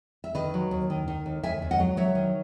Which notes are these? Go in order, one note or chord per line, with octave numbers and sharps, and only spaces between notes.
E5
D#3 B4 D#5
F#3
D#2
D#3
D#3
D#2
D#2 E5 G#5
D#2
D#5 F#5
F#3
F#3 C#5 E5
D#3